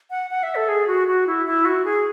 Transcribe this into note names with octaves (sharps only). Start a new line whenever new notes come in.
F#5
F#5
E5
A4
G#4
F#4
F#4
E4
E4
F#4
G#4